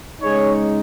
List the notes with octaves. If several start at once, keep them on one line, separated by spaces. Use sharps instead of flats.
C#3 G#3 D#4 G#4 C#5